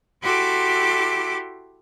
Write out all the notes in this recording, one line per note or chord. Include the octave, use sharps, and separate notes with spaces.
E4 F#4 G4 A4 C6 D6